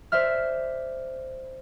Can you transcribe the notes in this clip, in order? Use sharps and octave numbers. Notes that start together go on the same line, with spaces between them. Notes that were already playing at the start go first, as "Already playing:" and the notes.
C5 D5 E5 F6